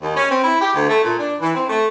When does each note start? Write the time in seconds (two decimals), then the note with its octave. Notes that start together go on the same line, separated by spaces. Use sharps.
0.02 D#2
0.16 C#4
0.30 C4
0.43 E4
0.61 G4
0.74 D2
0.88 A3
1.04 A#2
1.19 D4
1.41 E3
1.54 C4
1.69 A3